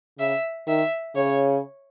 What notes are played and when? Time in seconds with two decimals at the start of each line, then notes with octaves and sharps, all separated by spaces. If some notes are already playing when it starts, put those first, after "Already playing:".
0.19 C#3 E5
0.67 D#3 E5
1.16 C#3 C#5